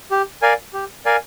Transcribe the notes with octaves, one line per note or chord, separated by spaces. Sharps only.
G4
A#4 D5 F5 G#5
G4
A#4 D5 F5 G#5